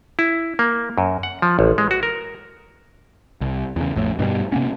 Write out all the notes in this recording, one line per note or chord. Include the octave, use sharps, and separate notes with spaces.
E4
A#3
F#2
F#5
F3
A1
G#3
F#4
A#4
C2
E2 C#3
A1 F2 A2
G2 B2 D3 G3
C3 A#3 B3 C#4